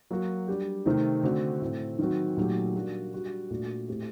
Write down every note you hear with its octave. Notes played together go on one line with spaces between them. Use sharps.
F#3 A#3 F#4
G3 D4 G4
C3 D#3 A3 C4 D#4
D3 A3 C4 F#4
A2 A3 C4
D#3 F#3 C4 F#4
A#2 F#3 A3 D#4 G4
G3 A#3 D4 F#4
G3 D4 F#4
A#2 A3 D4 F#4
A2 A3 C4 G4